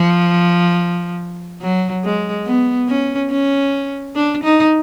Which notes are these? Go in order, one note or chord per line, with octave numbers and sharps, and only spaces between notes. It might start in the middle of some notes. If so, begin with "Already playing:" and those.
Already playing: F3
F#3
G#3
B3
C#4
C#4
D4
D#4